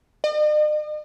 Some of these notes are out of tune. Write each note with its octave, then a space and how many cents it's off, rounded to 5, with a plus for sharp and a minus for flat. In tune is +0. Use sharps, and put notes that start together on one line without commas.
D#5 -45